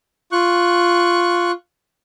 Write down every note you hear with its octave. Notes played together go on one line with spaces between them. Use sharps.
F4 C#6 F#6